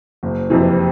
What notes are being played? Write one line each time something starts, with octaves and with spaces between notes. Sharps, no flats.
F#1
F2 C3 E3